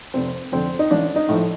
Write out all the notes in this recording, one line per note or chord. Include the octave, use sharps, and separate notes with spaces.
F1 C4
F2 D3 C4
D#4
A1 D4
D#4
A2 F3